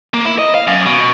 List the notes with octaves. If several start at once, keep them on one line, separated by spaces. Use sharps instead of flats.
A#3
E4
D#5
F5
F#2
B2